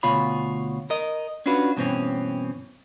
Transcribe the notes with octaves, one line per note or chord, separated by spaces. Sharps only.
D2 B2 F4 C#5 B5
A#4 D#5
C#4 D4 F4 F#4 B4
G2 B2 E3 C4 C#4